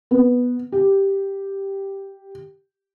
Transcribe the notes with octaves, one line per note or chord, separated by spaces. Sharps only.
B3
G4